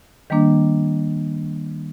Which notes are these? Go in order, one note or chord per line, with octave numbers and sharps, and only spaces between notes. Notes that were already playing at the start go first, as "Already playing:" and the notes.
D#3 G3 A#3 D4